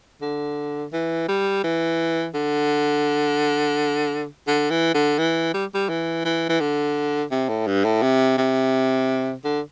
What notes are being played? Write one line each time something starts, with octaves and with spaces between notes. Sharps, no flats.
D3
E3
G3
E3
D3
D3
E3
D3
E3
G3
G3
E3
E3
E3
D3
C3
A2
G2
A2
C3
C3
D3